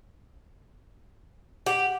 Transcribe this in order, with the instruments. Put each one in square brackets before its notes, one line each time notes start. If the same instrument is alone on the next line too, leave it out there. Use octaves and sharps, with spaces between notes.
[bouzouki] G4 [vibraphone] F#5